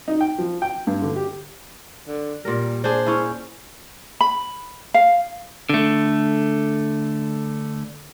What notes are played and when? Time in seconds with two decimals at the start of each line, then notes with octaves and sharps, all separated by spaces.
0.08 D#4
0.21 G5
0.38 F3
0.62 G5
0.87 G2
1.02 D3
1.16 G4
2.07 D3
2.45 A#2 G3 A#4
2.84 D4 G#4 C5
3.06 C#4 E4
4.21 B5
4.94 F5
5.70 D3 A3